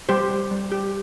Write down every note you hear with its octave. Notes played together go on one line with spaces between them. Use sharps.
G3 G4 C5
G3
G3
G4